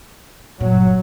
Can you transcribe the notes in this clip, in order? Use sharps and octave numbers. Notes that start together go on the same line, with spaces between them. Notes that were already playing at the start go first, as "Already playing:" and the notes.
G1 A#2 F#3